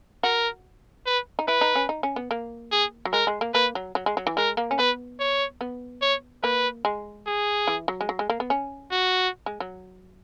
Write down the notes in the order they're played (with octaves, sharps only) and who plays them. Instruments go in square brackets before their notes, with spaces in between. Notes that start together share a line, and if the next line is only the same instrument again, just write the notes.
[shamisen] F#4 [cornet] A#4
[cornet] B4
[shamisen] D#4
[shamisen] E4 [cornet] B4
[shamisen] D#4
C#4
D#4
C#4
B3
A#3
[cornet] G#4
[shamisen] F#3
[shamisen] G#3 [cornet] A#4
[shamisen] G#3
A#3
[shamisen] A#3 [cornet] B4
[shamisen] F#3
F#3
G#3
F#3
E3
[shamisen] G#3 [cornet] A#4
[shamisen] A#3
C#4
[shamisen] B3 [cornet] B4
[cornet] C#5
[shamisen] B3
[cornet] C#5
[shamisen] A#3 [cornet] B4
[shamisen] G#3
[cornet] G#4
[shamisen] E3
F#3
G#3
F#3
G#3
A#3
B3
C#4
[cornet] F#4
[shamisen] G#3
F#3